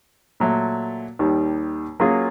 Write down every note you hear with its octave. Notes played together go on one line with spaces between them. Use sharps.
A#2 F#3 A3
D#2 D#3 G3
F#3 A#3 C#4 F4 G#4